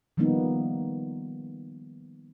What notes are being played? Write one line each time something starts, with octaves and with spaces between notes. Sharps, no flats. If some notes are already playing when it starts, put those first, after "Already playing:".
D#3 F3 G3 A#3 B3 D#4